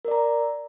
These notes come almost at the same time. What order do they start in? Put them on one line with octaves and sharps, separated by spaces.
A#4 D5 A#5